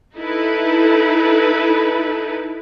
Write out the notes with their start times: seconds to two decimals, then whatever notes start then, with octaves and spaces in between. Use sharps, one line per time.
0.17 D#4 E4 A4 B4